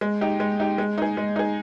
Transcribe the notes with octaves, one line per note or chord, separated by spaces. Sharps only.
G#3
D#4 G4
G#3
D#4 G4
G#3
D#4 G#4
G#3
D#4 G#4